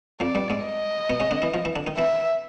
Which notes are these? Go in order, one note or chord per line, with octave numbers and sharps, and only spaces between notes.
F2 F3 D5
G2 G3
G#2 G#3
D#5
B2 B3
C#3 C#4
D3 D4
E3 E4
F3 F4
E3 E4
D3 D4
D#3 D#4
E3 E4 E5